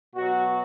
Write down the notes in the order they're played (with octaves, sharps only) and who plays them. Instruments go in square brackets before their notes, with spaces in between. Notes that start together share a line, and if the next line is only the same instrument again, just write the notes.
[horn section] B2 F#3 F#4